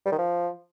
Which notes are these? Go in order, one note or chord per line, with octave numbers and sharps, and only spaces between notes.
G3
D#3
F3